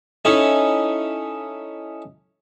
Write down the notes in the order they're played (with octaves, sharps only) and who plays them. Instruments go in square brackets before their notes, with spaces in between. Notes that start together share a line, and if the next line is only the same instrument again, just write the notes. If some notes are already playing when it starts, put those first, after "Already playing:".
[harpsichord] C#4 D#4 E4 A4 C#5